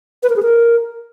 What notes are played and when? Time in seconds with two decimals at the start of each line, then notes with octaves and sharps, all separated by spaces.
0.23 B4
0.30 A#4
0.36 G#4
0.43 A#4